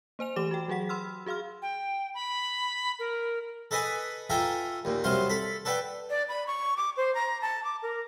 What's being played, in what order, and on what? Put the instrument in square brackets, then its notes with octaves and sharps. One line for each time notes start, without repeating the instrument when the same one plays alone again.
[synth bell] A#3 C5 G#5 F7
E3 A3 G4 D6 E7
F#4 G5
F#3 F#4 G#4 F#5 B6
B5 C6 E6 F6
F#4 G#4 F5 C6 F6
[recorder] G5
B5
A#4
[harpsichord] A4 B4 D#5 G#5 B5
F4 A4 E5 G5 G#5 A#5
D#2 A#2
C2 C3 F#3 C5 F5 C6
A4 B5
A4 B4 D5 F#5 G5
[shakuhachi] D5
B5
C#6
D6
C5
A#5
A5
D6
A#4